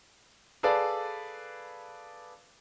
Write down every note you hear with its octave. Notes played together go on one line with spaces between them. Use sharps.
G#4 A4 B4 D5 F5